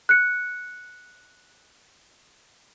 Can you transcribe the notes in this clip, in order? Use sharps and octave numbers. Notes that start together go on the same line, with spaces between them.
F#6 C#7